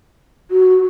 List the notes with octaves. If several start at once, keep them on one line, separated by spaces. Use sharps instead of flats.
F#4